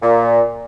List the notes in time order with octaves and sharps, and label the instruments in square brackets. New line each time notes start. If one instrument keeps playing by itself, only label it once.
[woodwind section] A#2